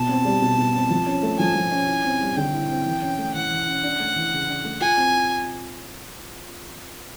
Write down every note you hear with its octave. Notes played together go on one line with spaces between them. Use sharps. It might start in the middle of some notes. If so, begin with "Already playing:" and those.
Already playing: B2 A5
C4
G3
B2
B2
C4
F3
C#4
A3
F3 G#5
F3
C#4
E4
C4
G3
D3 G5
E4
C4
E3
C#4
A3
E3 F#5
E3
C#4
D4
A3
E3
C#3
D4
A3
F4 G#5
C4